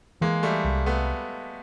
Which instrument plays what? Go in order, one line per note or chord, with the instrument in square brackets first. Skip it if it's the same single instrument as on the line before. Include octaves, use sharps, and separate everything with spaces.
[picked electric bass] E3 [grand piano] G#3 A#3
[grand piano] G3 A3
[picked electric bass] C2
[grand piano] A3 B3